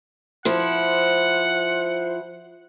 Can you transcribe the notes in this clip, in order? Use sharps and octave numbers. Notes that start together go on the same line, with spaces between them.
F3 E4 C5 F#5